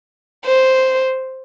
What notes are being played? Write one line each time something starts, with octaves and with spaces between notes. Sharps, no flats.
C5